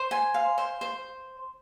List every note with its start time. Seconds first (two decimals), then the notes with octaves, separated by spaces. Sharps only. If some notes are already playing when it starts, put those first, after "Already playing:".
Already playing: C5
0.11 G#5
0.34 F5
0.58 C5
0.81 C5